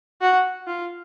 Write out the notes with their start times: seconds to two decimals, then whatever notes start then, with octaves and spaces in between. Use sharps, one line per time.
0.21 F#4
0.67 F4